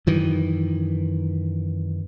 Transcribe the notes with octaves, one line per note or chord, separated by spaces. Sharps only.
F#2 D#3 E3